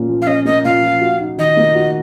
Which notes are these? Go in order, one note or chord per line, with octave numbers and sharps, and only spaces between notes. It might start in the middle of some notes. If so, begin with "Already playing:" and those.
Already playing: A#2 A#3 C#4
F3
F5
C#4 D#5
A#3 D#5
A#2 F5
F3
F#4
D#4
D#3 D#5
A#3
F#4